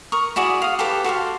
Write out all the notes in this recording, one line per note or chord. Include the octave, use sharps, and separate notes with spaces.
A#4 C#6 D#6
E4 F#4 G#4 D5
F5 D#6
G4 A4 B4 D6
F#4 A4 C5 F5